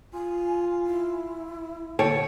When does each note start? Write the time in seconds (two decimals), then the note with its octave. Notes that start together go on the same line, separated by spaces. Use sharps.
0.14 F4 G#5
0.86 E4
1.99 D3 A4 C#5 G5 A5